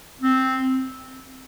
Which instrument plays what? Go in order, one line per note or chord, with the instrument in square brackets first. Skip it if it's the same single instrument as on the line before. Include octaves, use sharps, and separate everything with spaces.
[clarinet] C4